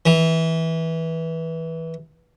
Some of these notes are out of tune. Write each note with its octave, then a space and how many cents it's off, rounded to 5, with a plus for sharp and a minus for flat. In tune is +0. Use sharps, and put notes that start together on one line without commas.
E3 -15